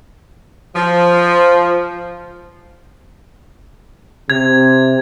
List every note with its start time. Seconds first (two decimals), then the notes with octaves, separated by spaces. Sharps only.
0.76 F3
4.30 C3 G#6